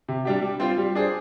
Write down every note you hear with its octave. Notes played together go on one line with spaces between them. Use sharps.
C3
G3 D4 G4
G3
C4 F4 C5
G3
D4 G#4 C5